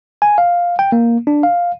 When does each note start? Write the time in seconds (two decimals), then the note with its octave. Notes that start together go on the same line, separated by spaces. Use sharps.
0.22 G#5
0.38 F5
0.79 G5
0.92 A#3
1.27 D4
1.43 F5